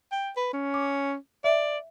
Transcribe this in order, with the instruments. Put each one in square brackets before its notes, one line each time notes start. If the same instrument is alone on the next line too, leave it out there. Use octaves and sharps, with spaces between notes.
[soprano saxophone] G5
B4
C#4
[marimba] D6
[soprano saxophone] D5 [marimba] E5